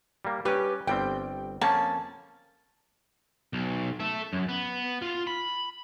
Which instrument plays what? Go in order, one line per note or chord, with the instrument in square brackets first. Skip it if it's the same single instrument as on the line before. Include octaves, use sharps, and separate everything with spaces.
[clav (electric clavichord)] G3 A#3
[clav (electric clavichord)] G3 C#4 [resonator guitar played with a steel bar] G4 B4
[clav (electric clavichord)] G1 G3 C4 [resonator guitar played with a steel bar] G5
[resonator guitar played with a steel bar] F2 [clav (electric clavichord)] A#3 C#4 [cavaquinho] A5
[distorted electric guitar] B1
A4 E5
F#2
B3
F4
B5